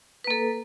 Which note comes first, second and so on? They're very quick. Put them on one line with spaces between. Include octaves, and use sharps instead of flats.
B4 A#3 A4